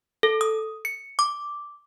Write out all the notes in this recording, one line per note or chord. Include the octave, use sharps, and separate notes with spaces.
A4
D#6
C#7
D6